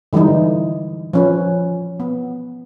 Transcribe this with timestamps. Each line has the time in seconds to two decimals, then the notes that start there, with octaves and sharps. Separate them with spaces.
0.13 D3 E3 G3 G#3 D#4
1.13 F3 C#4 B4
2.00 B3